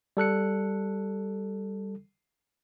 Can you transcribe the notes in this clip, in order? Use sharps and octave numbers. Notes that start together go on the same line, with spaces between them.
G3 A4 F#6 C#7